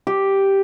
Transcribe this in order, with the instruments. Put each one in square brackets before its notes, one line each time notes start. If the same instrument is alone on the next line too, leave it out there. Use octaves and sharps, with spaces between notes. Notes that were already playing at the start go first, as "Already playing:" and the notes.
[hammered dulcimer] G4